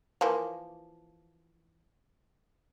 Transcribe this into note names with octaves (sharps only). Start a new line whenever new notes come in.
E3 F3 A#3